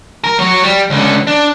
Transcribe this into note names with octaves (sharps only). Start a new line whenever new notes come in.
A#4
F#3 C#5
G3
C#2 D3
D4